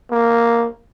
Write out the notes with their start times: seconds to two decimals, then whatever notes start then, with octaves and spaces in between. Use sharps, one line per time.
0.11 A#3